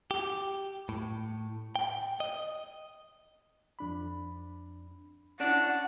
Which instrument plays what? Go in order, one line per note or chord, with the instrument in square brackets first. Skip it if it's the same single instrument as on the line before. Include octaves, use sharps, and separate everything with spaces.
[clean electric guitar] G4
A2
G5
D#5
[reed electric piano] F2 D4 B5
[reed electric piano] C#4 E4 [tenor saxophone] D4 [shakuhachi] F#5